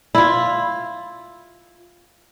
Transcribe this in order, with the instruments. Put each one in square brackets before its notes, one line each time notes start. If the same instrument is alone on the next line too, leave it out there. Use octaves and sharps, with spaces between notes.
[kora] E4 F4